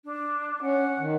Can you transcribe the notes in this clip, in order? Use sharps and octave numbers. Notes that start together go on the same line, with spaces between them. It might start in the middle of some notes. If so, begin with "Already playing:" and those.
D4
C#4 F#5
D#3